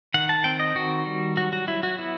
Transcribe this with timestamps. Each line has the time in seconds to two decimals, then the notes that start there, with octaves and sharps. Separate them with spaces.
0.14 D#3 F#5
0.29 A5
0.44 C4 G5
0.60 D#5
0.75 D#3 F#4
1.06 G3
1.37 F#3 F#4
1.53 F#4
1.67 F#3 E4
1.83 F#4
1.99 B3 E4